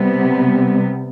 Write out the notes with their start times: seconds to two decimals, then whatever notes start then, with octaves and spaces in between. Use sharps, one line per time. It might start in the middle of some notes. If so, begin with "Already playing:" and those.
Already playing: C3 G3 B3